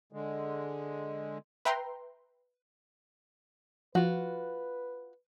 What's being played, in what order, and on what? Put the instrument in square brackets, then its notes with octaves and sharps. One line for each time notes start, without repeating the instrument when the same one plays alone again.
[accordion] D3 G#3
[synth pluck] B4 E5 G5 A#5 C6
[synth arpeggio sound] F3 [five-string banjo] F4 F#4 [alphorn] B4